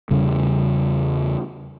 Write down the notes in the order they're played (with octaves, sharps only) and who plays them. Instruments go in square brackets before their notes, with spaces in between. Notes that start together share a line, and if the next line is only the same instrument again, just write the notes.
[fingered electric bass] E2 C#3 G3